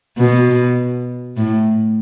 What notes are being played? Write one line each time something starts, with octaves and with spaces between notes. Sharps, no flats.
B2
A2